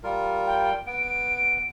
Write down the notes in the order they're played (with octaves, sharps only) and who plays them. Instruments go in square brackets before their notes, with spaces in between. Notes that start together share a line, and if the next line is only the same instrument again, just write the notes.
[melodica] G3 F4 A#4
[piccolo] G5
[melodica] B3 [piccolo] D7
[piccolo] D7